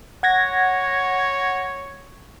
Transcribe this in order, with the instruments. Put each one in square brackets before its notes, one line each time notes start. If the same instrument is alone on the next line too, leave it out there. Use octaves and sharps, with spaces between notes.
[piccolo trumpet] C#5 [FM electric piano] F#5 G#6 A#6